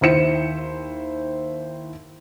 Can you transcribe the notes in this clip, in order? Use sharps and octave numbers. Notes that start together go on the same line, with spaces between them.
D#2 E4 C5 C#7 E7